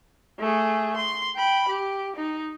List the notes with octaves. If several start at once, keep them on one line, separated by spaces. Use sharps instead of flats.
A3 G#4
C6
G5 B5
G4
D#4